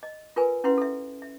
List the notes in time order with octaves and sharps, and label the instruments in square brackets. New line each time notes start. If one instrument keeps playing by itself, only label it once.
[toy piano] D#5
F4 A#4 B4 G#5
C#4 E4 B4 F#5 C6
A4 E5
E5